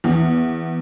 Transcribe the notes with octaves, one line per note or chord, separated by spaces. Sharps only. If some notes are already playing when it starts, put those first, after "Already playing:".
E2